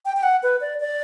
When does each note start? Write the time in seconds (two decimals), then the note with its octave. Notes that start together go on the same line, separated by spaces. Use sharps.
0.05 G5
0.17 G5
0.23 F#5
0.43 B4
0.61 D5
0.80 D5